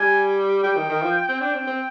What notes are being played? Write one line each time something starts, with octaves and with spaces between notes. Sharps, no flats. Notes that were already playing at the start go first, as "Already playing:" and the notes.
Already playing: G3 G#5
G3 G5
D#3
D#3
F3
C4
D4 G5
C4
C4